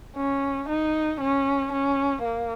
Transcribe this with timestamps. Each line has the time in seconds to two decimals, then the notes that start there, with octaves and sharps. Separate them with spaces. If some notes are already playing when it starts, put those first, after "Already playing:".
0.16 C#4
0.69 D#4
1.21 C#4
1.73 C#4
2.25 A#3